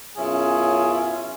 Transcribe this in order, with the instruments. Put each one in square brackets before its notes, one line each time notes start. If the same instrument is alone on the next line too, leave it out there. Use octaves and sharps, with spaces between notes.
[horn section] F#2 B2 C#4 E4 F4 G#4